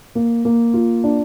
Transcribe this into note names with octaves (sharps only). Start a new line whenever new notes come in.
A#3
A#3
F4
D4